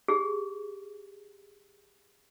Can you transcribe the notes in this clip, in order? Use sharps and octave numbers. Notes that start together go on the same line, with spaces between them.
G4 G#4